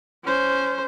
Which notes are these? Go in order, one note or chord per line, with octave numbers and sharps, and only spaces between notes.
C#4 C5